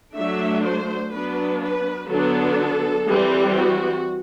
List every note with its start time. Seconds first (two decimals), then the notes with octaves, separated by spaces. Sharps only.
0.16 F#3 A3 D4 E5
0.64 C5
1.12 F#3 B3 D4 B4
1.62 B4
2.10 D3 F#3 B3 D4 A4
3.08 E3 G3 C4
3.56 F#4